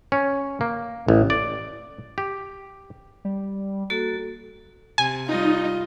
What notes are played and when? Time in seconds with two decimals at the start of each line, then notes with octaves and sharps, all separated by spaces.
0.12 C#4
0.61 A#3
1.08 A1
1.30 D5
2.18 G4
3.25 G3
3.90 A#3 F#4 A4
4.98 C3 G#5
5.29 G3 D#4 F4 D#5